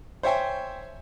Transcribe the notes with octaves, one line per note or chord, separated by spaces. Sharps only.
C5 C#5 E5 G5 G#5